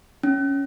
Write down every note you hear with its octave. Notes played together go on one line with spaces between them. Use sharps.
C#4